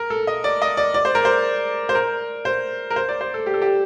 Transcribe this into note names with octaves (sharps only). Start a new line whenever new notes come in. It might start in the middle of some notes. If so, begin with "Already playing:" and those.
Already playing: A#4
A4
D#5
D5
D#5
D5
D5
C5
A#4
C5
C5
A#4
C5
A#4
C5
D5
C5
A4
G4
A4
G4